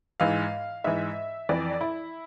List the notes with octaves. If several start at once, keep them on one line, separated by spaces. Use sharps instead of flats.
G#2 E3 F5
G#2 E3 E5
F2 E3 D5
E4